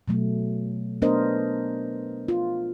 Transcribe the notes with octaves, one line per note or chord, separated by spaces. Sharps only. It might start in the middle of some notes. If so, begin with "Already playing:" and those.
B2 F#3 A3
A3 B3 D4 A#4 C5 D#5
F4